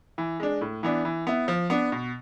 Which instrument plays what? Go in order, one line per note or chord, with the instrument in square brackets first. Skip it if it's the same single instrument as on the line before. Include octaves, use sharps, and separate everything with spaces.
[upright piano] E3
G#3 D4
A2
E3 B3 D4
E3
B3 E4
F3
B3 D4
B2